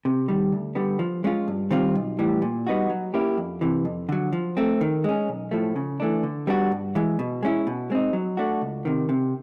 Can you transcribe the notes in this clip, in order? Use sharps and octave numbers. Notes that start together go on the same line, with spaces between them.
C3
D#3 G3
D2
D3 G3 B3
F3
G#3 C#4 F4
G2
D#3 G3 C4 F4
B1
A2 E3 G3
A#2
G3 B3 D#4 F#4
F#3
A#3 C#4 E4 G4
F2
C3 E3
F2
D3 F#3
F3
A3 C4
D#3
G#3 C#4
B1
A2 F3 A3
C#3
E3 A3 D4
D3
G3 B3 D4 F#4
G2
E3 G#3
B2
G#3 C#4 E4
B2
G#3 C4 D#4
F#3
A3 D4 F#4
C#2
C3 D#3
C3